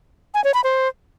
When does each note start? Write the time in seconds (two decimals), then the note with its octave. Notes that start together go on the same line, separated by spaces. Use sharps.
0.34 G#5
0.44 C#5
0.54 B5
0.64 C5